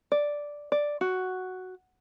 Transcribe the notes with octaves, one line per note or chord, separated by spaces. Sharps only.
D5
D5
F#4